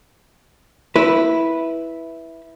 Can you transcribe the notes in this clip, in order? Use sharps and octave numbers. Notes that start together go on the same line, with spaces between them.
E4 B4